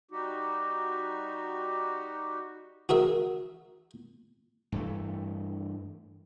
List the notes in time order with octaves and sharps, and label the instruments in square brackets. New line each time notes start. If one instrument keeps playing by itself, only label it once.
[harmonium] G3 D#4 F#4 G4
[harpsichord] F#4 G#4 A#4 E5
[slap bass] G2 E3 A3